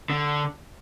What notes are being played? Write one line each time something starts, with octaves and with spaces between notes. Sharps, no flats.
D3